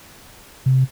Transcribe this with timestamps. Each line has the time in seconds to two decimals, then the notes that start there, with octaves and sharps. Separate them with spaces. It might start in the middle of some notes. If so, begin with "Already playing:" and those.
0.66 C3